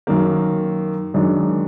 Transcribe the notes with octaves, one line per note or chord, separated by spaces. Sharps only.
F#2 D#3 A#3
F#2 D#3 G#3 D4